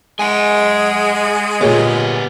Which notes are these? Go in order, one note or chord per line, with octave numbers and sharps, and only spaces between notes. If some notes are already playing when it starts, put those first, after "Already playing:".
G#3 F#5 G#5
A#2 B3 G4 G#4 C#5